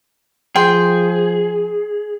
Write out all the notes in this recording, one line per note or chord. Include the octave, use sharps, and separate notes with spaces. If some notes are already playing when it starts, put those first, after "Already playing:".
F3 G#4 G5 C6